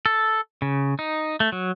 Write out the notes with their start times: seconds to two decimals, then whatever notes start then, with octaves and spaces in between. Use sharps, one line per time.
0.06 A4
0.62 C#3
0.99 D#4
1.40 A3
1.52 F#3